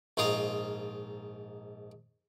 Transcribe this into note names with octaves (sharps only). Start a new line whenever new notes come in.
A#1 G#2 F4 A#4 F5 D#6